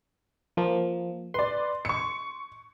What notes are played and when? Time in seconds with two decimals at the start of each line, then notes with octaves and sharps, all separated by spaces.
0.57 F3 A#3
1.34 B4 D5 C6
1.85 C#6 C#7